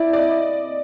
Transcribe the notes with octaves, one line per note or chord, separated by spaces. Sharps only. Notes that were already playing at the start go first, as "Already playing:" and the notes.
Already playing: E4 D5
D5
D#5